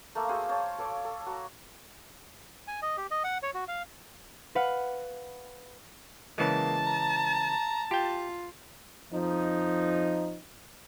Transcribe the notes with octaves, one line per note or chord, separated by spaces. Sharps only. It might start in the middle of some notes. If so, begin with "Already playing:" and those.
A3 A#3 A4
F#4 G#4 C5 F5
C5 C#5 A5
A4 C#5 F5 D6
A4
F#4 A#5
G#5
D#5
G4
D#5
F#5
C#5
F#4
F5
B4 F5 F#5
C#3 E3 G#3 A#3 A5
A#5
F4 G4 G5
F2 F3 D#4